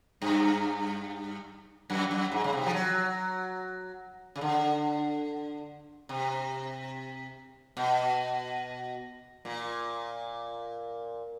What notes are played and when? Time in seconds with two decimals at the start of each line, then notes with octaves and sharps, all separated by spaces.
0.22 G2
1.90 F#2
2.11 F#2
2.32 G#2
2.44 C#3
2.53 C3
2.66 F3
2.73 F#3
4.36 C#3
4.41 D3
6.09 C3
7.77 B2
9.45 A#2